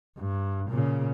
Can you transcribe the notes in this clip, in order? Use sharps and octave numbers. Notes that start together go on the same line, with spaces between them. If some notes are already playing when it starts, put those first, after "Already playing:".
G2
A#2 C#3